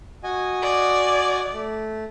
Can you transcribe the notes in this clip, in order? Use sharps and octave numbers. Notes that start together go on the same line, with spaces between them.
F#4 D#5 G#5
D5
A3